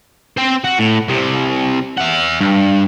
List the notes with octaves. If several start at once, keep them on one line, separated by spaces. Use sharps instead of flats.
C4 C5
F#4
A2
C2 C3
E5 F#5
G2